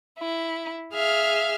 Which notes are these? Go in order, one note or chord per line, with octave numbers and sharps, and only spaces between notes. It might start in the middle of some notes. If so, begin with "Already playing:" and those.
E4
G#4 E5 F5 F6